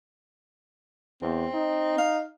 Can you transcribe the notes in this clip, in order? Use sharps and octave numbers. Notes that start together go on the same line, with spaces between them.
E2 C4
D#4
F5